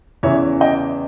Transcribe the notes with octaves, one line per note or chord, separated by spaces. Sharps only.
E2 C#3 E3 C#5 E5
D#5 G5